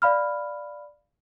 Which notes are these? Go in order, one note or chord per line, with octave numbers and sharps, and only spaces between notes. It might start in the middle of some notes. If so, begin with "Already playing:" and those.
D5 F5 B5 F6